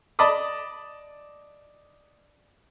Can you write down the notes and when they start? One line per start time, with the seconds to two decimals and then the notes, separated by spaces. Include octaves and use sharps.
0.19 D5 D#5 A5 B5 D6 D#6